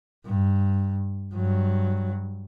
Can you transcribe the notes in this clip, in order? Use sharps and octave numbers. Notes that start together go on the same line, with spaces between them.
G2
G2 F#3